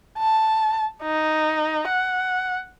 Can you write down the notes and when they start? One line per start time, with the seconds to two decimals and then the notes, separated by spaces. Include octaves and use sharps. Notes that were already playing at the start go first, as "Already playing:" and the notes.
0.18 A5
1.03 D#4
1.88 F#5